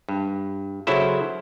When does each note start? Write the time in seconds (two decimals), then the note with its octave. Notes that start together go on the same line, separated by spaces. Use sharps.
0.09 G2
0.87 C#3 F#3 E4 A4 C5